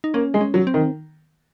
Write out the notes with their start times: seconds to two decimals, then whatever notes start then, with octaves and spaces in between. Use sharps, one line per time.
0.04 D#4
0.14 A#3 C#4
0.34 G#3
0.41 C#4
0.54 F#3
0.67 C4
0.74 D#3